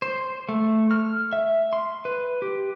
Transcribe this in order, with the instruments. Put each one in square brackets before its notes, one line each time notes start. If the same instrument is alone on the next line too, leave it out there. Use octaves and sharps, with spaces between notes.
[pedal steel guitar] C5
A3
F6
E5
C6
B4
G4